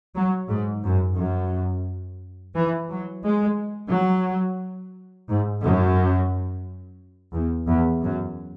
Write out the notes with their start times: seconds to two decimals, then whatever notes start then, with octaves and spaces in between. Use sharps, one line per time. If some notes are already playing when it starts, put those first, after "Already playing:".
0.15 F#3
0.49 G#2
0.84 F#2
1.18 F#2
2.55 E3
2.90 F#3
3.24 G#3
3.91 F#3
5.28 G#2
5.63 F#2
7.33 E2
7.68 E2
8.03 F#2